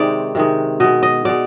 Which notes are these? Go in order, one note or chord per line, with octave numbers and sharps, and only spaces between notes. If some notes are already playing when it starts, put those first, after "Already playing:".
Already playing: C3 D#3 G#3 C5 D5
C3 D#3 G#3
B2 G#3 D#5
D#5
B2 G#3 D5